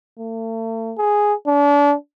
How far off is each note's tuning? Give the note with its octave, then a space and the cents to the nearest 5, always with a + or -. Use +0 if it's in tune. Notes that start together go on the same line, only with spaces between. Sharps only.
A3 +40
G#4 +0
D4 -35